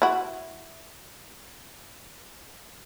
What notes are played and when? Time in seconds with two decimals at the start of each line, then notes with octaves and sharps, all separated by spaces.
0.02 E4 F#4